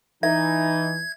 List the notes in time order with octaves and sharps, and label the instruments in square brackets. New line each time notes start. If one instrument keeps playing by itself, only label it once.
[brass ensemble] E3 [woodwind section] D#4 [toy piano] E5 [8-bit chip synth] G#6